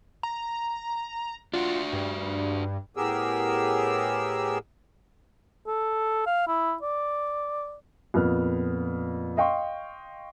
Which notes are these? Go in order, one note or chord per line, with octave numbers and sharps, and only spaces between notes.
A#5
D4 F4 F#4
G2
A2 B3 G4 G#4 A#4 E6
A4
F5
E4
D5
F2 A#2 B3 F6
D#5 F5 G5 C6 C#6